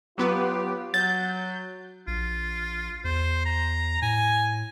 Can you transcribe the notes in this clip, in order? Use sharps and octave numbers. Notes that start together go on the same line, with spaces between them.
F#3 B3 F4 G4 B4
F#3 G6 A6
A#1 F4
E2 C5
A#5
A2 G#5